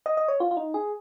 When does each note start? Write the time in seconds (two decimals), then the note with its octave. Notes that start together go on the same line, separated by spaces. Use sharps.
0.06 D#5
0.17 D#5
0.28 C#5
0.40 F4
0.51 F4
0.57 D#4
0.74 G#4